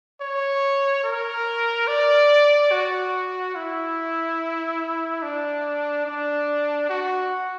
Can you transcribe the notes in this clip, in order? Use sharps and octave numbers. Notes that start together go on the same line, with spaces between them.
C#5
A#4
D5
F#4
E4
D4
D4
F#4